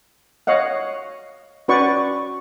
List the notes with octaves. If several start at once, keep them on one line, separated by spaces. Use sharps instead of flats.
C#5 D#5 F5 F#5
C#4 F#4 B4 D5 C#6